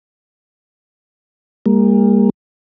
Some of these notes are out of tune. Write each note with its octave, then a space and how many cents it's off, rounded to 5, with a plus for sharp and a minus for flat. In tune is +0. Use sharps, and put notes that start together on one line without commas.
G3 +45 A#3 +0